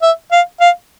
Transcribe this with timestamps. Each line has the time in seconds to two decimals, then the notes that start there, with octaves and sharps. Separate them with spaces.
0.02 E5
0.32 F5
0.60 F5